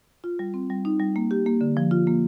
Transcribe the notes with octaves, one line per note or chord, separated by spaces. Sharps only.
F4
G3
C4
G3
D#4
G3
A#3
G4
A#3
D3
F3
F4
A#3